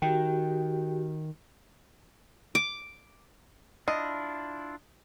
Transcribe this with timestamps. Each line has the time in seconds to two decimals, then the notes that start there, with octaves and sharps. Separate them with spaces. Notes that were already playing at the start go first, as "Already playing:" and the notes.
0.02 D#3 F#4 G4 G5
2.55 D6
3.88 D4 E4 F4 D#5